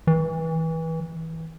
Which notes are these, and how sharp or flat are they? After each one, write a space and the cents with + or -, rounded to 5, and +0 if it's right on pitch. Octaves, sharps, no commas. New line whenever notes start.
E3 -25